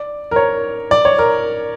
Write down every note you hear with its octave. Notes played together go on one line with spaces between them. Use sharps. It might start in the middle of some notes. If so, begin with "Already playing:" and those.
Already playing: D5
A#4
C#5
D5
C#5
A#4